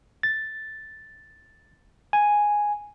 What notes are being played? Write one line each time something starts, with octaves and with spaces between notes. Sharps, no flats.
A6
G#5